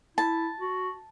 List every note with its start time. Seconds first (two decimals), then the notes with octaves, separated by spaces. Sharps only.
0.17 E4 A5
0.60 F#4